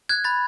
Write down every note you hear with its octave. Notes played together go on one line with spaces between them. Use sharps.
F#6 G#6
B5 A6